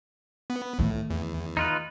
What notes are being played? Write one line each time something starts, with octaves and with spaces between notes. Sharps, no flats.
B3
A2 D#3 A3
E2
D#4 F4 B4